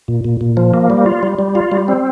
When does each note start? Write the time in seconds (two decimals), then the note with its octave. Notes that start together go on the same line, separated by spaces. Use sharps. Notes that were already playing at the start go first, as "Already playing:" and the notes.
0.08 A#2
0.25 A#2
0.41 A#2
0.57 F3
0.74 A#3
0.90 G3
1.06 F4
1.23 G3
1.39 G3
1.55 F4
1.72 G3
1.88 C4